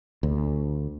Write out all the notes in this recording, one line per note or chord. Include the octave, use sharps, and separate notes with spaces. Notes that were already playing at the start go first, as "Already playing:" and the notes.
D2